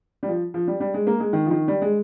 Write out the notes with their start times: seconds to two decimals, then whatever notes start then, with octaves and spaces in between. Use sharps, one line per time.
0.23 G3
0.28 F3
0.54 F3
0.68 G3
0.80 G3
0.94 G#3
1.07 A#3
1.20 G#3
1.33 D#3
1.46 F3
1.51 D#3
1.68 G3
1.82 G#3